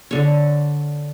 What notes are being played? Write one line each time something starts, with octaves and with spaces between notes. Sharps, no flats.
D3 C#5